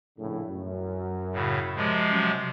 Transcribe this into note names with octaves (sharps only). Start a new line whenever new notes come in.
A#1 A2 C#3
F#2
A2 C#3
C3 F3 G#3
F#3 C#4 D#5